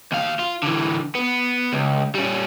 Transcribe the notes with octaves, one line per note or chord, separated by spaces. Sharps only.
D#2 F5
F4
D3 E3
B3
C#2
G3 C#4